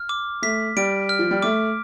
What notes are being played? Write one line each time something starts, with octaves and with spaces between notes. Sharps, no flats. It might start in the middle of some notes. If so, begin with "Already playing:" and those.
Already playing: F6
D6
A3 B6
G3 D7
F6
F3
G3
A3 D6